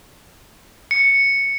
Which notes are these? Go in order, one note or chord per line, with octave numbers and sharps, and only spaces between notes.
C#7